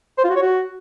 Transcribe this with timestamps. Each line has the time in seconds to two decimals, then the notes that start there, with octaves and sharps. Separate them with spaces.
0.18 C5
0.24 F4
0.30 F#4
0.36 C#5
0.42 F#4